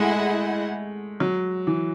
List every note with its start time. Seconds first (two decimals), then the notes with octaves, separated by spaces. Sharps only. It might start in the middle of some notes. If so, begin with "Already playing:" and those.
Already playing: G#3 A3 E4 G#4 D#5 F#5
1.20 F#3
1.67 E3